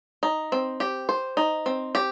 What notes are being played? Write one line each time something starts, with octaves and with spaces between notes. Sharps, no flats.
D#4
C4
G4
C5
D#4
C4
G4